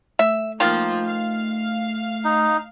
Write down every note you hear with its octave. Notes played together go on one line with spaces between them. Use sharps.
A3 E5
D#3 F3 A#3 F4
F5
D#4